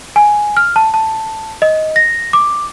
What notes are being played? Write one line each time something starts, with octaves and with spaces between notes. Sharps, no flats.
G#5
F6
A5
A5
D#5
A#6
D6